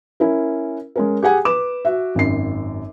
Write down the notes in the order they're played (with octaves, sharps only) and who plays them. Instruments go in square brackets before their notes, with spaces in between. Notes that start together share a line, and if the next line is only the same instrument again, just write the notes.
[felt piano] C#4 E4 A#4
G#3 C#4 A#4
G4 G#4 F#5 G#5
B4 D6 E7
F#4 E5
G#1 F#2 C7